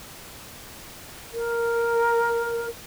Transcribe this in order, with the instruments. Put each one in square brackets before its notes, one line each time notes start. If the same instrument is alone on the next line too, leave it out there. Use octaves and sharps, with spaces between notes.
[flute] A#4